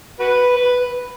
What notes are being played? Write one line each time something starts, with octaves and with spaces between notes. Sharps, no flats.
F#4 B4
B4